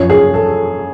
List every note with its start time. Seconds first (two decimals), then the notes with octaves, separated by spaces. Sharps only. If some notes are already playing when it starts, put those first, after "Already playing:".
Already playing: F#2 F3 C#5
0.10 G#4
0.34 A4